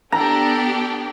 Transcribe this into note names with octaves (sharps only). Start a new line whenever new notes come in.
B3 D4 G4 A4 A#5